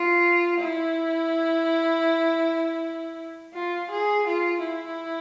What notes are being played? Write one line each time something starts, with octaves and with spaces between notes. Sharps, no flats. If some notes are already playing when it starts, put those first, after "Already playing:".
Already playing: F4
E4
F4
G#4
F4
E4